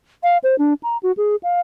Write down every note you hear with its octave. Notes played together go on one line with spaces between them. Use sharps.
F5
C5
D4
A#5
F#4
G#4
F5